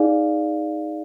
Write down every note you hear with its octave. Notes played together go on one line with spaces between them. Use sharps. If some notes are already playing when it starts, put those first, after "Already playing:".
Already playing: D#4 G#4 D5 F5